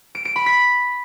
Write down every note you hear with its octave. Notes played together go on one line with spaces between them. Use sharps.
D7
D7
B5
B6